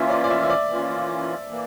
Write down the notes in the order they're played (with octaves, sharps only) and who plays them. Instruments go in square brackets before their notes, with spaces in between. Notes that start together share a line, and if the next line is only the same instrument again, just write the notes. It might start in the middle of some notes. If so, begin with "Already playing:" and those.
Already playing: [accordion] E3 A#3 C#4 F4 [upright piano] E5
[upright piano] D5
D5
E5
E5
D5
[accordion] E3 A#3 C#4 F4
E3 A#3